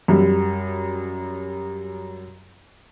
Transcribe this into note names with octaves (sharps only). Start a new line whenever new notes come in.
F#2 G3